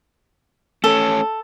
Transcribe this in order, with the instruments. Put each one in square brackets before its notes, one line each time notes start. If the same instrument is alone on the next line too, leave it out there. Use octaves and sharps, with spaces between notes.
[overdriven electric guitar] A3 C#4 [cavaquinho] A4